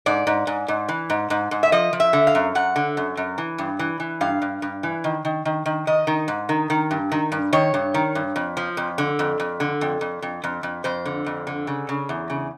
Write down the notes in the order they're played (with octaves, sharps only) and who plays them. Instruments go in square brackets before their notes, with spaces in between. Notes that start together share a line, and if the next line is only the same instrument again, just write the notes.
[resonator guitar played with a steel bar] G#2 D5
G#2
G#2
G#2
E3
G#2
G#2
G#2
E5
F3 D#5
F3
E5
D3
F5
F#2
F#2 F#5
D3
F#2
F#2
E3
G2
E3
E3
G2 F5
G2
G2
E3
D#3
D#3
D#3
D#3
D#3 D#5
D#3
G#2
D#3
D#3
G2
D#3
G2
D#3 C#5
G2
D#3
G2
F2
F3
F2
D3
F2
F2
D3
F2
F2
F2
F2
F2
F2 C5
D3
F2
D3
C#3
C#3
E2
C#3